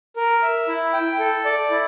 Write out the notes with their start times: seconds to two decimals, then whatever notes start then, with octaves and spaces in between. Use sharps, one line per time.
0.16 A#4
0.42 E5
0.68 E4
0.93 G5
1.19 A4
1.45 D5
1.71 E4